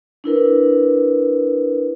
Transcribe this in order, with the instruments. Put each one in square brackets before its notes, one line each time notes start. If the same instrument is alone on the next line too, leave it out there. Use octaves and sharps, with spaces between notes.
[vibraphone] D4 E4 A#4 B4